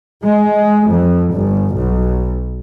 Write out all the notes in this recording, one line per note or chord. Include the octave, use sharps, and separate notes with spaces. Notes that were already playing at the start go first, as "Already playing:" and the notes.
G#3
F2
G1
B1